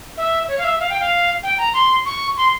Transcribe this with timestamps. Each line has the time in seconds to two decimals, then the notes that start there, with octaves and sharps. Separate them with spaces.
0.17 E5
0.48 C#5
0.58 F5
0.64 E5
0.80 F5
0.90 G5
1.00 F5
1.43 G5
1.58 A#5
1.74 C6
2.05 C#6
2.37 C6